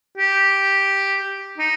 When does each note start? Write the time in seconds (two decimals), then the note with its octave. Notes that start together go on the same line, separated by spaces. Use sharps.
0.17 G4
1.58 D#4